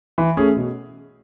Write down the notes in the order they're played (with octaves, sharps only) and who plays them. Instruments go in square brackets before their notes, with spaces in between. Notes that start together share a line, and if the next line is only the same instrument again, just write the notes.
[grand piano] E3
A3 C#4 G#4
B2